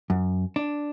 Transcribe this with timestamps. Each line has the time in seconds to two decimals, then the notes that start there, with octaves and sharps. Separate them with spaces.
0.10 F#2
0.56 D4